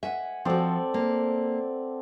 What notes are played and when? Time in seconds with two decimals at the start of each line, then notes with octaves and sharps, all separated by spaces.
0.03 E5 F#5 G#5
0.45 F3 C4 F#4 A4 D5
0.94 A#3